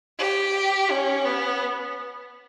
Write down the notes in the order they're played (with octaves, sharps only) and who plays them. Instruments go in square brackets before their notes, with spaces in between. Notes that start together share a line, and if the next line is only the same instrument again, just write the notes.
[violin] G4
C#4
B3